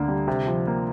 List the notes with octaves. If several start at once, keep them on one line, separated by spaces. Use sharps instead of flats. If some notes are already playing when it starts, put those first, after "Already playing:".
Already playing: D2 D3 A#3
G3
C3
F3
A#3